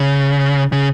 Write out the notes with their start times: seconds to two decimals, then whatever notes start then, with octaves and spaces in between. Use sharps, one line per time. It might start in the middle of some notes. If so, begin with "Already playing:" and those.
Already playing: C#3
0.72 C#3